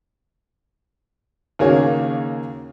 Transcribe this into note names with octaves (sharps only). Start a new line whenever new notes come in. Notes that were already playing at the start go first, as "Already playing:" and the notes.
D#2 C#3 A#3 F#4 G#4 C#5